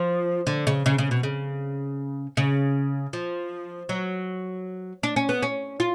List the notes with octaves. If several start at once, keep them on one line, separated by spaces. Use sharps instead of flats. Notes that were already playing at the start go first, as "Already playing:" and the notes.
Already playing: F3
D3
C#3
C#3
C#3
B2
C#3
C#3
F3
F#3
D4
C#4
B3
C#4
F4